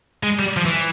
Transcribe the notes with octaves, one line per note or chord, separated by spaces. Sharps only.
G#3
G3
F3
E3